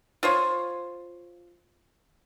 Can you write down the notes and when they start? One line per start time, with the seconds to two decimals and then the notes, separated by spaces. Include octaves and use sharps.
0.23 F4 C5 C#5